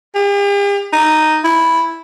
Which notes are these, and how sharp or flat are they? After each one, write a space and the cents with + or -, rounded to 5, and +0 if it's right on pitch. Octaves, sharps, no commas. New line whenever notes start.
G4 +45
D#4 -5
E4 -5